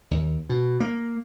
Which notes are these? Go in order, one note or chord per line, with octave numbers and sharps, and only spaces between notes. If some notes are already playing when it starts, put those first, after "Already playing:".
D#2
B2
A#3